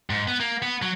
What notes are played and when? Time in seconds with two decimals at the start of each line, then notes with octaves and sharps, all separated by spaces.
0.10 G#2
0.28 B3
0.40 A#3
0.62 B3
0.82 F#3